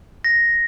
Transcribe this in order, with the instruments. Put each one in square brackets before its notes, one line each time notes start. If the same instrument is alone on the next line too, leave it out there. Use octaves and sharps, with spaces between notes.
[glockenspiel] A#6